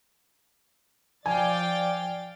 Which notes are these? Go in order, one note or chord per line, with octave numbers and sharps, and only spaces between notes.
F3 D5 F5 G5 G#5 A6